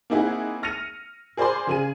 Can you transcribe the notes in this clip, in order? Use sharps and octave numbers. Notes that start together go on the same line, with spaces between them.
A#3 C4 D#4 E4 G#4 F#5
F6 A#6 C#7 D#7 F7
G#4 A#4 C5 D5 G#5 C6
C#3 G#4 D#7